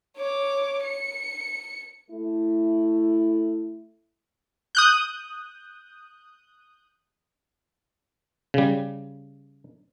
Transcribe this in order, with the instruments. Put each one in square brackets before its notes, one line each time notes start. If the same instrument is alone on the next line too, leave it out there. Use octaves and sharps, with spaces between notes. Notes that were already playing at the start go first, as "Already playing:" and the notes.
[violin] C#5 D6
C#7
[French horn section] A3 E4
[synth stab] D#6 F#6 G6
[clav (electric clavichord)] C#3 G3